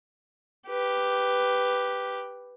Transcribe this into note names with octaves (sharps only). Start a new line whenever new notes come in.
G4 B4